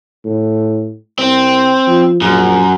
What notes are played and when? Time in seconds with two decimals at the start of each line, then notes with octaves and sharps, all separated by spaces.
0.25 A2
1.19 C2 C4
1.87 F3
2.21 A#1 F#2